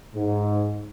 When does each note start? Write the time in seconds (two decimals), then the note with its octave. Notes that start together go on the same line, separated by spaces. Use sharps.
0.16 G#2